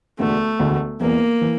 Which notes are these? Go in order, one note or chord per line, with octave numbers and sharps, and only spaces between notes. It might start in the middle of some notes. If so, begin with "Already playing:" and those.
E1 D2 D3 A3
E1 D2 D3
E1 E2 E3 A#3
E3